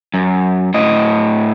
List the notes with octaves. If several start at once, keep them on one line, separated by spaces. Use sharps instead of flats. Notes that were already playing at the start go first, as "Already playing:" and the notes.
F#2
A2 D#5